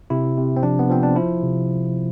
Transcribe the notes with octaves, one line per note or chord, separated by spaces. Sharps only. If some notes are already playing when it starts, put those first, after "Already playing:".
C3 E4
C3
C4
F3 D4
B3
F3 C4
D4
F3 E4
C3